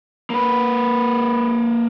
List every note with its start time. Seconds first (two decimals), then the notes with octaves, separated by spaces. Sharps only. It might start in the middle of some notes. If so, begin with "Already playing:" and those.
0.30 A#3 B4